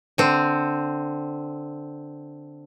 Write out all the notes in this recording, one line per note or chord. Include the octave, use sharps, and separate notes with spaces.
D3 C4